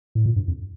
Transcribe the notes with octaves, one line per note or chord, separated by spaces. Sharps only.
A2
A#2
G2
F2